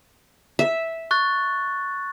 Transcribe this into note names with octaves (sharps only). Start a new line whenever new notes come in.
E5
C#6 F#6 A6